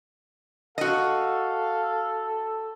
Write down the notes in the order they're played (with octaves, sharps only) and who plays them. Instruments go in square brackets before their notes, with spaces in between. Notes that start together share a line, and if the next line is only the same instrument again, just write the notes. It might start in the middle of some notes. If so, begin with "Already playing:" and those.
[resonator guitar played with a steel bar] F#4 D#5 [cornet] A4 [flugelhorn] F5